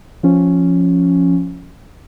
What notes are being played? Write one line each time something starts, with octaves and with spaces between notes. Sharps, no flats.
F3 C#4